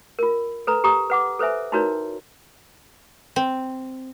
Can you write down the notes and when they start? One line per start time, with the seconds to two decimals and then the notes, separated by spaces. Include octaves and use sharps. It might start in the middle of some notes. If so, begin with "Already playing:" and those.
0.19 F4 A#4
0.67 A4 B4 A#5
0.84 G4 A#5 D#6
1.10 B4 F#5 D6
1.39 A4 B4 C5 E5 G#5
1.72 D#4 E4 F#4 A#4 B4 C#5
3.36 C4